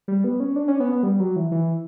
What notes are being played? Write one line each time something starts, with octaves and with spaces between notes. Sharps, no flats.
G3
B3
C#4
D4
C#4
B3
B3
G3
F#3
E3
E3